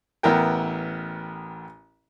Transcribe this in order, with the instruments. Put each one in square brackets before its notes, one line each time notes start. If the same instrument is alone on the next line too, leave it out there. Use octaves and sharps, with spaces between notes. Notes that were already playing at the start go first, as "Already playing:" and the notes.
[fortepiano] A1 B3 E4 A#4 G5